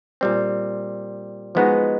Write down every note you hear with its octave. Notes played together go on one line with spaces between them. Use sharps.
A#2 G3 C4
F3 G#3 B3 D#4 F#4